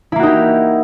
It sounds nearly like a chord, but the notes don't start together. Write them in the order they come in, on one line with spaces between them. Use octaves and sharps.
E4 A#3 F#4 D#4 G4